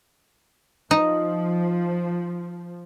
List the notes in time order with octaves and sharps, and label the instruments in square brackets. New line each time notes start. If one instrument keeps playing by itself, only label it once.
[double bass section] F3 [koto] D#4